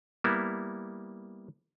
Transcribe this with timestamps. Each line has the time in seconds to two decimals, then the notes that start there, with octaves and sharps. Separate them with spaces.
0.24 G3 A#3 B3 E4